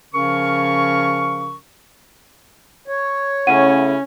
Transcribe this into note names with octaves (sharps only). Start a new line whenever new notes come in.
C#3 F3 C#4 A#4 C#6
C#5
C#3 A3 C#4 E4 F#5 D#7